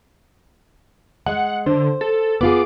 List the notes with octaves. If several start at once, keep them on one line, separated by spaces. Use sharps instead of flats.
G#3 F#5
D3 C5
A4
B3 F4 G#4 D6